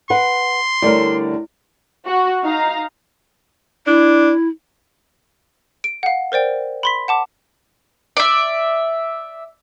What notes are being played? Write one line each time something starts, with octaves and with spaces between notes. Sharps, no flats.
B4 F#5 C6
D3 G3 A3 E4 A#4 C#5 D5
F#4
D#4 F5 A#5
D4 E4
D7
F5 F#5
A#4 C5 D5 G5
B5 C6 B6
F#5 A5 D6
D5 E5